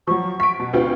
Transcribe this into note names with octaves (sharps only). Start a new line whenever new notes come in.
F3 F#3 C#6
B6 D7
B2
D2 C4 F4 B4